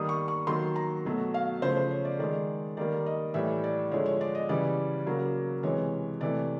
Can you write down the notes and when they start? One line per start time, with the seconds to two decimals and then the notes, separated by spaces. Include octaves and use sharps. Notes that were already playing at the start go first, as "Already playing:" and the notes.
Already playing: D#3 G3 A#3 D#6
0.09 C#6
0.28 C#6
0.47 D#3 F#3 A#3 C6
0.76 A#5
1.05 B2 F#3 A3
1.34 F5
1.62 C#3 F3 A3 C5
1.77 C5
1.91 C#5
2.05 D5
2.19 D#3 G#3 D5
2.77 D#3 G3 A#3 D5
3.06 D#5
3.34 A2 E3 G3 E5
3.64 D5
3.91 D3 F3 G#3 C#5
4.06 C#5
4.21 D5
4.35 D#5
4.49 C#3 E3 G3 D5
5.06 C#3 F#3 A#3
5.63 C3 E3 G#3 C#5
6.21 C3 E3 A3 D5